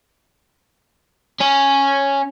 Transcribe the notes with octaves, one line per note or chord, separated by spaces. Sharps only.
C#4